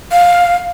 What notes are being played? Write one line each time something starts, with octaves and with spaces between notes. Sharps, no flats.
F5